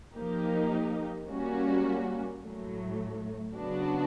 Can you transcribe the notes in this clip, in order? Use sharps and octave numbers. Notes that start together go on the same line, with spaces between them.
F3 A#3 D#4 G4 A#4
G3 A#3 C#4 F#4
A2 F#3 A3
C#3 F#3 B3 D4 F#4